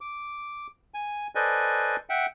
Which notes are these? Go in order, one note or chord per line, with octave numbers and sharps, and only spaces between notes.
D6
G#5
A4 B4 C5 D5 D#5 G#5
E5 F#5 G5